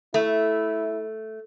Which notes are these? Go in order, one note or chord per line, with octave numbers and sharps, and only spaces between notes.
A3 E4